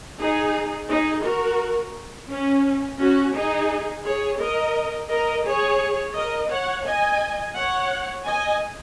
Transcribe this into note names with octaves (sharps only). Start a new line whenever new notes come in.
D#4 G#4
D#4 G#4
F#4 A#4
C#4
C#4 F#4
D#4 G#4
G#4 C#5
A#4 D#5
A#4 D#5
G#4 C#5
A#4 D#5
C#5 F#5
D#5 G#5
C#5 F#5
D#5 G#5